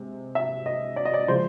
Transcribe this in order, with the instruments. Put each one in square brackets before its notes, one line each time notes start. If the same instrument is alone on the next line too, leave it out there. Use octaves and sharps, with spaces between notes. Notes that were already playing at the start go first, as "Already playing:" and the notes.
Already playing: [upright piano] C3 G#3
E5
D#5
D5
D#5
D5
C#3 F3 G#3 C5